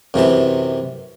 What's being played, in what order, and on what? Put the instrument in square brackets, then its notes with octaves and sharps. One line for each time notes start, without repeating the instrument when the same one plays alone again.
[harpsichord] F#2 C3 E3 A5